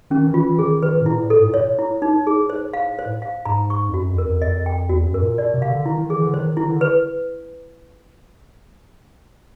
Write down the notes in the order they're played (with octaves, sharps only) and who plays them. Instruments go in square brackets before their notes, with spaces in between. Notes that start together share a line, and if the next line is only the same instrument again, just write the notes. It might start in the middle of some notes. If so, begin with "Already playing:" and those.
[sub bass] D#3 [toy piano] C#4
[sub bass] E3
[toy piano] F4
[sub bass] E3
[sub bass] D#3 [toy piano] G#4
[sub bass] D#3 [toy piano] B4
[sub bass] D#3
A2
[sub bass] A#2 [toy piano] E4
[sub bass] A2
[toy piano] A4
[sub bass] G#2
A#2
[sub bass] A2 [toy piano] C#5
[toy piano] E4
D#4
G#4
C5
F5
C5
F5
[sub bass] G#2 [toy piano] A#5
[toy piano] C#6
[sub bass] F2
[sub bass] F#2 [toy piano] F#4
[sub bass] F2
[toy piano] A#4
[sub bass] F2
[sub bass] F2 [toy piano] D#5
[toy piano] G5
[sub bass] E2 [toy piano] F#4
[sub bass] F#2
[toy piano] A#4
[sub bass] A#2
[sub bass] B2 [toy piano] D5
[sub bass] C3
[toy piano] F5
[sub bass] D3
[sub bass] D#3 [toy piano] E4
[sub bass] D#3
[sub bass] E3 [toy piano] G#4
[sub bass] D3
[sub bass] D#3 [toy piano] C5
[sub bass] D#3 [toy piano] E4
[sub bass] D3
[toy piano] B4